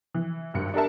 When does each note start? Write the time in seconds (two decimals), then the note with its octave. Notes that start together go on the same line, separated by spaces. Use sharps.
0.14 E3
0.54 G#1 G2 C#7
0.74 D4 G4 A#4 E5 A5